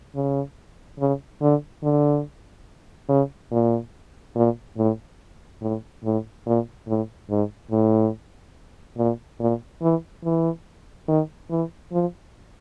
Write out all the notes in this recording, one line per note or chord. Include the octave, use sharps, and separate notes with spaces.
C#3
C#3
D3
D3
C#3
A#2
A#2
A2
A2
A2
A#2
A2
G#2
A2
A#2
A#2
E3
E3
D#3
E3
F3